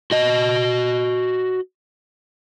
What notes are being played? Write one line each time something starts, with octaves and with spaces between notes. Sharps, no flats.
F#4 D#5